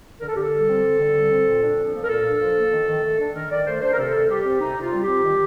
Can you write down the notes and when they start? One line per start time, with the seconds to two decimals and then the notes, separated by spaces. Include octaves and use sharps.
0.20 D3 A#4
0.28 A4
0.36 D3 G4
0.42 A4
0.52 G3
0.68 C4
0.83 D3
0.99 D3
1.14 G3
1.31 C4
1.46 A#2
1.62 D4
1.77 F3
1.93 A#3
2.02 A#4
2.09 A#2 A4
2.25 D4
2.40 F3
2.56 A#3
2.71 D#3
2.87 D#3
3.03 A3
3.19 D4
3.34 D#3 A#4
3.50 D#3 D5
3.65 A3 C5
3.81 D4 C5
3.92 A#4
3.98 C3 A4
4.13 C3
4.28 G3 G4
4.45 C4
4.60 C3 D#4
4.76 C3 F4
4.92 G3
5.02 G4
5.07 C4
5.22 D#3